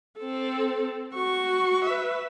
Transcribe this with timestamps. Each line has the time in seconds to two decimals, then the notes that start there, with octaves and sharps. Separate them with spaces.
0.20 C4 A4
1.15 F#4 C#6
1.85 B4 E5